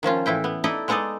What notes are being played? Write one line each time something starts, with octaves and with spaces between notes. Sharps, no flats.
D#3 F3 C#4 F4
A2 E3 E4 G5
B3
D#4 E4 A4 D5 D#5
G#3 B3 D#4 A4 D5 D#5